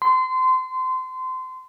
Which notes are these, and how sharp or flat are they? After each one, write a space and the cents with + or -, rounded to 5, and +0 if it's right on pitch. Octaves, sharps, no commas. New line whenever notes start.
C6 -25